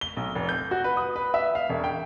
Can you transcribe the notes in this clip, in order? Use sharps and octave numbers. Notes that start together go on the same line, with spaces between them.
G7
B1
F1
G6
F#4
B4
D#6
B4
E5
F5
E1
G5